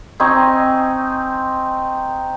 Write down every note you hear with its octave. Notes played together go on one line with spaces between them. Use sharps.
C4 D#4 G#5 C#6